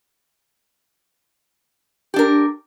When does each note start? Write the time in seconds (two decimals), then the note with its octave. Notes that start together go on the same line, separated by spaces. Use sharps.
2.14 G4
2.16 D4
2.19 A#4